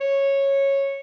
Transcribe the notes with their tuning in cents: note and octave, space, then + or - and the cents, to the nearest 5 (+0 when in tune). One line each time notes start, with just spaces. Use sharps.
C#5 -10